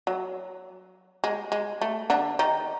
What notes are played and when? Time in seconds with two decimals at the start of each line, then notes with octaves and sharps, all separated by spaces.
0.07 F#3
1.24 G#3
1.52 G#3
1.81 A3
2.10 D3 D4
2.39 D#3 D#4